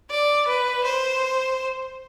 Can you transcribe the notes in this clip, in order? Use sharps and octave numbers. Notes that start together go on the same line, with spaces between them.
D5
B4
C5